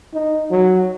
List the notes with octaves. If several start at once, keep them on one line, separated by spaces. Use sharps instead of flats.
D#4
F#3